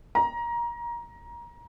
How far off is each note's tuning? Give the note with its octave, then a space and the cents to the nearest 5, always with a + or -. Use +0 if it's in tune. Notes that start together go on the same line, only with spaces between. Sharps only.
A#5 +20